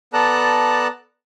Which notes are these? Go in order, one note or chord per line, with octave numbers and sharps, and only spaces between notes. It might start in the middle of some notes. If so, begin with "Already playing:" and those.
B3 A4 D5 A5 A#5 F#6